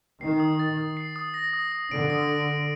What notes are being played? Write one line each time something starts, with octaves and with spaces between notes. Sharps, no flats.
D#3 C7
D#6
A6
D#6
C7
D#6
A#6
D#6
D#6
D3 D7
D#6
D7
D7